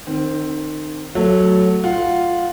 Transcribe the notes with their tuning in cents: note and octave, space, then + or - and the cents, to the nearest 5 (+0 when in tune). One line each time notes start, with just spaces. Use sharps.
D#3 -25 C4 +10
F#3 +0 A3 +0
F4 +0 F#5 +0